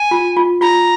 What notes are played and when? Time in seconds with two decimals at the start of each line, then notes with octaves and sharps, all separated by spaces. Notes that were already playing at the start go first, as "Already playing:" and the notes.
Already playing: G#5
0.11 F4
0.37 F4
0.61 F4 A#5